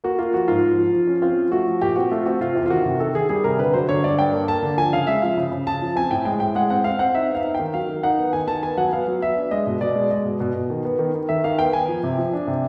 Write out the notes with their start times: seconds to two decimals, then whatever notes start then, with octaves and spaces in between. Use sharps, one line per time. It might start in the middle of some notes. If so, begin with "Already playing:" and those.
0.04 A#3 F#4
0.19 A#3 F4
0.33 F3 F#4
0.48 G#2 F4
0.63 F3
0.78 F3
0.93 F3
1.07 C#4
1.22 C4 F4
1.37 F3
1.51 A3 F#4
1.67 F3
1.82 A#2 G4
1.96 C4 F#4
2.11 A3 F4
2.26 C4 F#4
2.40 C3 F4
2.55 E2
2.66 F4
2.70 D#3 F#4
2.85 C3
2.99 D#3 A4
3.15 D#3 G#4
3.29 G3 G#4
3.44 C3 A#4
3.59 D3 B4
3.74 F#3 C5
3.89 D3 C#5
4.04 G2 D5
4.19 G2 G5
4.33 A#3
4.48 A#3 A5
4.63 D3
4.77 F3 G#5
4.93 C#3 F5
5.07 G#3 E5
5.22 F3 F5
5.37 C#3
5.52 C#3
5.67 C#3 A5
5.82 F3
5.96 C4 G#5
6.11 A2 G5
6.25 G#3 G5
6.40 A2 G5
6.55 G#3 F#5
6.70 C4 F#5
6.84 C4 F5
6.99 C4 F#5
7.15 D#4 E5
7.29 B3
7.35 F5
7.44 D#4
7.54 G5
7.60 D#3
7.74 F#3 F5
7.89 D#3
8.03 D#4 F#5
8.18 B3
8.33 D#3 G#5
8.48 D#3 A5
8.63 B3 G#5
8.78 F#3 F#5
8.92 B3 F5
9.08 F#3
9.22 B3 E5
9.36 D4
9.51 G#3 D#5
9.67 B2
9.81 B2 D5
9.96 G#3
10.10 G#3 D#5
10.25 B2
10.40 B2
10.55 B2
10.70 D#3
10.85 B3
10.99 D#3
11.14 D#3
11.29 D#3 E5
11.44 D#3 F5
11.59 B3 G5
11.73 B3 G#5
11.88 F3
12.03 C3
12.18 F3
12.33 D4
12.47 C3